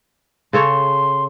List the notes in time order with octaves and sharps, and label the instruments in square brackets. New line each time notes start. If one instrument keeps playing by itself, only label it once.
[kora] C#3 A4 C#5 [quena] C6